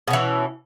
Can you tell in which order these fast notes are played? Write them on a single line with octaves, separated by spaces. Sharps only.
B2 C#4 E3